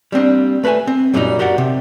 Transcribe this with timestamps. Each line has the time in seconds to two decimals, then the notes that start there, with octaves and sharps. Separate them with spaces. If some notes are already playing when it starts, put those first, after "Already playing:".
0.12 G3 A#3 C4 D4
0.64 A3 B4 D5 E5 G#5
0.87 C4
1.13 F#2 A#2 F#3 G3 B3 D#4
1.39 F#4 G4 A#4 D5 F#5
1.58 C3